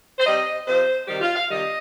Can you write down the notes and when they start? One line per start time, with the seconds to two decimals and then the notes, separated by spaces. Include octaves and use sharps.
0.19 C5
0.26 C3 G3 D#5
0.67 C3 F3 C5
1.08 C3 D#3 G3 G4
1.21 F4
1.35 F5
1.49 C3 D#3 G3 D#5